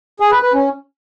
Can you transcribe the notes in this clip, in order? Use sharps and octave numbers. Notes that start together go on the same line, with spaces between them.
G#4
B4
B4
C#4